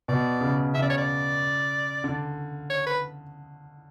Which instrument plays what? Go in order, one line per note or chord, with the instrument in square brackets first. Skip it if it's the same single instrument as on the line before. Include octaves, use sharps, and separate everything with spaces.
[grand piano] B2 [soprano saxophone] D5
[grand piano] C#3
[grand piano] C#3 [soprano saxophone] E5
[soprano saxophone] D5
C#5
D5
[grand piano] D3
[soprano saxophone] C#5
B4